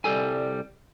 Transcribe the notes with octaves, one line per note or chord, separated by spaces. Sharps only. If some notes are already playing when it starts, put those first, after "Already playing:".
C2 G3 A4 G#5